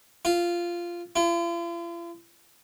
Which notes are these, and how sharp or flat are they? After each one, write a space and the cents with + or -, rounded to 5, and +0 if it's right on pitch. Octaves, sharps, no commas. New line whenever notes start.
F4 -10
F4 -45